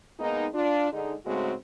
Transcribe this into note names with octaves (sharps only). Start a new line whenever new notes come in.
G#3 A#3 B3 D#4
D4 F4
D3 G#3 D#4
G#2 C#3 G#3 A3 C4 F#4